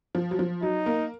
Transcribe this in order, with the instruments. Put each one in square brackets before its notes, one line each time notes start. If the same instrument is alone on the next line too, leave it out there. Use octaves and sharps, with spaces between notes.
[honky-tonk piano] F3
F#3
F3
[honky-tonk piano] F#3 [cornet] D#4
[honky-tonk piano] A#3